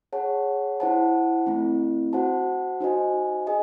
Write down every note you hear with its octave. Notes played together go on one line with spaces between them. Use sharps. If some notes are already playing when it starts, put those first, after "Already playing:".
G#4 C#5 F#5 A5
E4 C5 F#5 A5
A3 C4 E4
F#4 C5 F#5 A5
D#4 F#4 C5 D#5 G#5
G#4 D#5 G#5